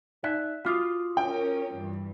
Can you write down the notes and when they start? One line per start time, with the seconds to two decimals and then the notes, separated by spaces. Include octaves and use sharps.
0.24 D#4 D5 E5 F#6
0.65 F4 F#4 F5 D6 D#6
1.17 C#4 A#4 G5
1.75 G2 E3